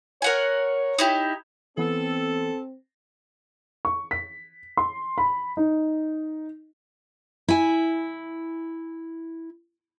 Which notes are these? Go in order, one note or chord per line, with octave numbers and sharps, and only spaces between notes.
A#4 C#5 F#5 G#5
D#4 E4 G4
E3 B3 C4 A4
C#6
B6
C6
B5
D#4
E4 G#5